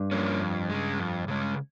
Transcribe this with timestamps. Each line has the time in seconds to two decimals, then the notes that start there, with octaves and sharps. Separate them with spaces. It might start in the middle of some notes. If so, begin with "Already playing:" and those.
Already playing: G2
0.11 F3 A#3 C#4
0.40 F2
0.69 C#3 G#3
0.99 F2
1.28 C#3 G#3